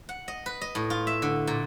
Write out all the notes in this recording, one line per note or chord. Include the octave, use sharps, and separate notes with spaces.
F#5
D#5
B4
D#5
A2
F4
E5
D3
A#2